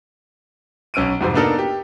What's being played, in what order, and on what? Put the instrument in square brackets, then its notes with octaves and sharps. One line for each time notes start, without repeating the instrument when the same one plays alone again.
[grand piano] B1 C#4 E6 D7 D#7
F2 G#2 C3 G3 C4
A#3 B3 D4 D#4 A4 A#4
G4